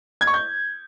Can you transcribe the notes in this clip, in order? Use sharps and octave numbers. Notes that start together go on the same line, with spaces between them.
G#6
C#6
G6